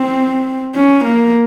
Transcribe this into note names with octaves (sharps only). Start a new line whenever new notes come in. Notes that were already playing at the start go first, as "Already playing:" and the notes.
Already playing: C4
C#4
A#3